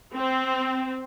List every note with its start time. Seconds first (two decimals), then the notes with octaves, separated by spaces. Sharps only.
0.15 C4